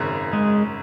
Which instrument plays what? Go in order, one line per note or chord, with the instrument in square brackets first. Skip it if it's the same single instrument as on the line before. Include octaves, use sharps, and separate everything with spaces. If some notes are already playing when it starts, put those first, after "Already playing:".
Already playing: [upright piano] G#1 F#2 C#3
[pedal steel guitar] G#3